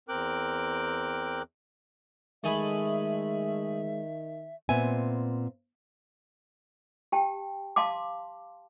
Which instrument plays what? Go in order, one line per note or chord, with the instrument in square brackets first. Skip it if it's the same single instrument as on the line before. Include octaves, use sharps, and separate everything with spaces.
[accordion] E2 C4 A#4 G5 D6 F#6
[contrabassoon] D#3 [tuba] G#3 [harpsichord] A3 G#4 B5 [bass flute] E5
[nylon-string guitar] A#2 B3 C4 E5 G#5
[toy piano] G4 G5 A5
F5 A5 C6 D6